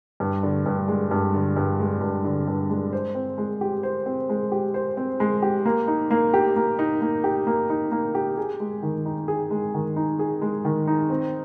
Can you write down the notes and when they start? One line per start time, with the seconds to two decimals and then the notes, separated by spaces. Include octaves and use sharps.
0.20 G2
0.43 D3
0.66 G2
0.88 G#3
1.11 G2
1.34 D3
1.56 G2
1.80 G#3
2.01 G2
2.25 D3
2.47 G2
2.70 G#3
2.93 C5
3.15 C4
3.38 G#3
3.61 G4
3.83 C5
4.06 C4
4.29 G#3
4.52 G4
4.74 C5
4.97 C4
5.20 G#3
5.42 G4
5.65 A#3
5.88 D#4
6.11 A#3
6.34 G4
6.56 A#3
6.79 D#4
7.01 A#3
7.24 G4
7.47 A#3
7.70 D#4
7.91 A#3
8.15 G4
8.38 G#4
8.60 G#3
8.83 D#3
9.06 D#4
9.28 G#4
9.51 G#3
9.74 D#3
9.96 D#4
10.19 G#4
10.42 G#3
10.65 D#3
10.87 D#4
11.10 C4